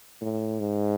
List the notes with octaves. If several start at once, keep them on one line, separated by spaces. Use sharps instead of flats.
A2
G#2